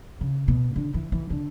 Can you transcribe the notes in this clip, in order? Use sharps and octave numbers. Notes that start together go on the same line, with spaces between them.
C#3
B2
D3
E3
E3
D3